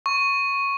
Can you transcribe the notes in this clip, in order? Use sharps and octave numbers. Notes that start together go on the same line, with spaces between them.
C#6